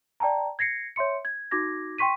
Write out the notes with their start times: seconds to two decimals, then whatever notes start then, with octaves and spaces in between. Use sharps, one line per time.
0.20 D5 G5 A5 A#5
0.59 G#6 A#6 C7 C#7
0.96 C#5 E5 C6 C#7
1.25 G#6
1.51 D#4 F#4 D6 G#6 A#6
1.98 G5 C6 C#6 B6 D#7